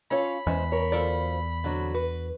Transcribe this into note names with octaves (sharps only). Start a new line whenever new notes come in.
C#4 F4 A4 C#5 F5 B5
E2 G#3 C#4 C5
A#4 C#5
D2 F4 A4 A#4 C5 D5
D3 F#3 C4
F#4 B4